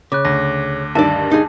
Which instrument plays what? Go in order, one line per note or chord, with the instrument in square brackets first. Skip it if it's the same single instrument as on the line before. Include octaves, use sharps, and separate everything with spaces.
[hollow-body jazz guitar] C#3 [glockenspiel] D6 F#6
[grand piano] D2 [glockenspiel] A#6
[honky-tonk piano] G2 D#3 [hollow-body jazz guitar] D5 E5 [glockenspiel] A5
[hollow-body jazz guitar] D#4 G#4